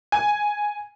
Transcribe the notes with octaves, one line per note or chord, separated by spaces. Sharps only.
G#5